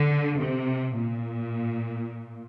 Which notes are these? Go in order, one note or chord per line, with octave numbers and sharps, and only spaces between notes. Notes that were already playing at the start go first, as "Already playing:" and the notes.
Already playing: D3
C3
A#2